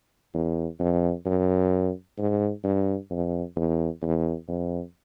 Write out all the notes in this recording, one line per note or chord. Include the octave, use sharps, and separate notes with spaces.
E2
F2
F#2
G#2
G2
F2
E2
E2
F2